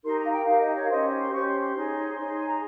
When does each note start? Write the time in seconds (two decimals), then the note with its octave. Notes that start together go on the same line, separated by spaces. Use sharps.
0.03 D#4 G4 A#4 C6
0.18 A#5
0.25 F5
0.32 G5
0.46 D#4 G4 A#4 F5
0.60 D#5
0.74 C#5
0.83 F5
0.89 C#4 G4 C5 D#5
1.17 C6
1.31 C#4 G4 C5 C#6
1.46 C6
1.60 C6
1.74 D#4 G#4 C#5
2.17 D#4 G#4 C#5
2.35 G#5
2.48 A#5